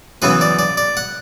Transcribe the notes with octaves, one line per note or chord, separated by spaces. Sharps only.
F#2 C#3 E3 B3 B4
D5
D5
D5
F#5